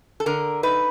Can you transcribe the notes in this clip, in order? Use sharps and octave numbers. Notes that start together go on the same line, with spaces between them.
A4
D3 A#4
D#4 B4